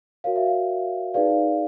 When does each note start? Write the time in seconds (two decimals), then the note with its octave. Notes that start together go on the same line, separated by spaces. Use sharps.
0.24 F#4 A#4 C#5 F5
0.36 E5
0.46 F5
1.14 D#4 G#4 B4 D5 F5